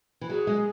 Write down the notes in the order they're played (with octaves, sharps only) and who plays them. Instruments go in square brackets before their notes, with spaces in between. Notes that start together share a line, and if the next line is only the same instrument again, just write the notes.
[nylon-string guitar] E3
[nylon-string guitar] F#3 [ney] G#4
[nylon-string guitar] G#3